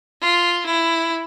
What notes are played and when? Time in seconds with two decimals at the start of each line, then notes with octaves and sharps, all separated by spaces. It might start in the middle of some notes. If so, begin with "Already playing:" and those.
0.21 F4
0.66 E4